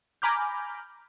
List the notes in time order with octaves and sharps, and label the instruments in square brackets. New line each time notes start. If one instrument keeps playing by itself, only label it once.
[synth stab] G#5 A#5 B5 D6 F6 G6